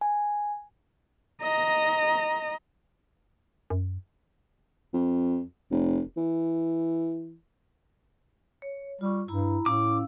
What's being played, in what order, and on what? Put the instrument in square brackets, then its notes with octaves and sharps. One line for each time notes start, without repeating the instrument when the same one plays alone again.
[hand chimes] G#5
[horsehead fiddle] D#5 A#5
[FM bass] F#2
[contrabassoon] F2
F1
E3
[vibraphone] C#5
[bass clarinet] G3 [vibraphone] F4 C#6
[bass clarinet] G2 [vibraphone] E4 A#5 B5
[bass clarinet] A2 [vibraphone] C#4 F5 E6 [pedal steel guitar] D6